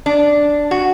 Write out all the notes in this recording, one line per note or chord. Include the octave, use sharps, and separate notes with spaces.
D4
F#4